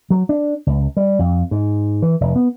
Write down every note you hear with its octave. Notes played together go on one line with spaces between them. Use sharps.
F#3
D4
C#2
G3
F2
G#2
E3
F1
B3